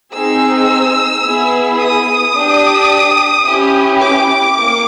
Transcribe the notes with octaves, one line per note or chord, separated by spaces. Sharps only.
C4 D#4 G#4 E6
B3 E4 G#4
D#6
D4 G4
C#4 E4 G4
D6
A#3